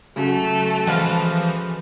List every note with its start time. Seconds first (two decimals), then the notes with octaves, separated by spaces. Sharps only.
0.16 C#3 F#3 A3 F#4
0.87 E3 F3 G#3 B4 F5